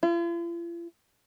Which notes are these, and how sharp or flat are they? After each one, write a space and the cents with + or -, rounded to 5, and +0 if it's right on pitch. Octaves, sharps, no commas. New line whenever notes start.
F4 -45